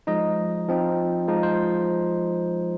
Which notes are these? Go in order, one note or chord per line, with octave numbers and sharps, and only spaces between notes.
F3 G#3 D#4 D#5
F3 C4 D#4
F3 G#3 D#4
C5